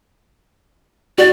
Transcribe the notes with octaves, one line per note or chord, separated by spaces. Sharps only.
F#4 D5